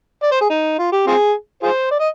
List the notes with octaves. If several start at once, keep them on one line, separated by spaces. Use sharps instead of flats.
D5
C5
G#4
D#4
F4
G4
C4 F4 G#4
F4 G#4 C5
D5
D#5